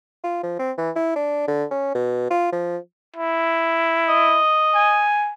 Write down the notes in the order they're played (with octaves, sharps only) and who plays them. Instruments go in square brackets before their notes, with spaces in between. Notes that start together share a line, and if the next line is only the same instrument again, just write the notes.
[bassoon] F4
F3
C4
E3
E4
D4
D3
C#4
B2
F4
F3
[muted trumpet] E4
[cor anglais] D#5
[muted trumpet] G#5